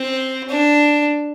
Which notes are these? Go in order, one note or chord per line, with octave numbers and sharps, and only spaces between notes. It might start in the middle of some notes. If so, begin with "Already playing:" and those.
Already playing: C4
D4